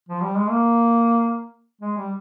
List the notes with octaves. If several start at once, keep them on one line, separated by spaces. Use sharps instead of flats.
F3
G3
G#3
A#3
G#3
G3